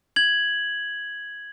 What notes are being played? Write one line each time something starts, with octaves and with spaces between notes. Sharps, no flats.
G#6 F#7